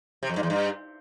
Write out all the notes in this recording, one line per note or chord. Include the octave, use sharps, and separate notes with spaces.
C3
F2
G2
E2
G2